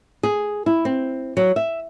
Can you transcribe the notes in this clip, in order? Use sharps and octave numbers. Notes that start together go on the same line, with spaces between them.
G#4
E4
C4
F#3
E5